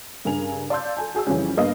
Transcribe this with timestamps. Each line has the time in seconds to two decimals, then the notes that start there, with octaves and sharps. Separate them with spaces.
0.25 G2 C#3 A#4 G#5 F7
0.70 D5 F5 A5 C6 E6 G6
0.97 A4 G#5 A5
1.15 F#4 G#4 A5 E6
1.27 F2 C#3 E3 F3 G3 C#4
1.57 G2 A#3 B3 D#5 F5